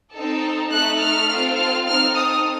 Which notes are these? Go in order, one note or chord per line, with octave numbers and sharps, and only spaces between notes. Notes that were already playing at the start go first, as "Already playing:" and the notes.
C4 D#4 A4
A3 D#4 A4 F#6
F6
C4 F4 A4
F6
C4 D#4 A4 F6
D#6